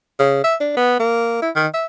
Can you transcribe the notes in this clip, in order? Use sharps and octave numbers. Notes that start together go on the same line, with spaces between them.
C#3
E5
D4
B3
A#3
E4
D#3
E5